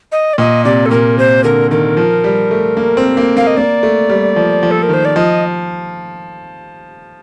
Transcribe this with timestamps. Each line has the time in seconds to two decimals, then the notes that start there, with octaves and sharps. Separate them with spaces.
0.12 D#5
0.33 D5
0.38 A#2 D#5
0.65 C3 D5
0.86 A4
0.91 A#2 A#4
1.18 C3 C5
1.44 D3 A#4
1.71 D#3 A#4
1.97 F3
2.24 G3
2.51 A3
2.77 A#3
2.97 C4
3.17 A#3
3.37 A#3 F5
3.47 D#5
3.57 A#3 D5
3.83 A3
4.09 G3
4.36 F3
4.63 F3
4.71 A4
4.83 A#4
4.89 D#3 C5
5.05 D5
5.16 F3 D#5